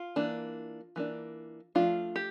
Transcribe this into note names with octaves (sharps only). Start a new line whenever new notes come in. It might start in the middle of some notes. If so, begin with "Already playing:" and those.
Already playing: F4
E3 A#3 D4
E3 A#3 D4
F3 A3 D4 F4
G4